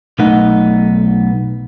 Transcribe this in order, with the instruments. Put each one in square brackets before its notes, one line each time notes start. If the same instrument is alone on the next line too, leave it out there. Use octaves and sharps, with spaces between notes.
[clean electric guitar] B1 A3 B3 D#4 F#5